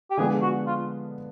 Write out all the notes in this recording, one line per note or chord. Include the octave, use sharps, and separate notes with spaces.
G4
D3 F3 G#3 B3 D4 G#4
F#4
F4